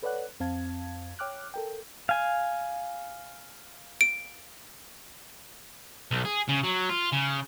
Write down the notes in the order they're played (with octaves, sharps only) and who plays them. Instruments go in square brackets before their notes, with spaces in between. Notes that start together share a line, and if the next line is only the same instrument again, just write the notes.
[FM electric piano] A4 B4 C#5 D5 F#5 F#6
F2 C4 F5 A5 G#6
C#5 G5 D6 F6 F#6
A4 A#4 G5
[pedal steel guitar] F5 G#5
[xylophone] D7
[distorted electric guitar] B1
G#4
C#3
F#3
F4
C#3